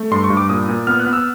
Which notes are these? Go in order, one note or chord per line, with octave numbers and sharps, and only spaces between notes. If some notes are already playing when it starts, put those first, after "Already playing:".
Already playing: A3
G2 C6
C#6
G2
D6
A#2 D#6
A#2
B3 F6
F#6
B3
E6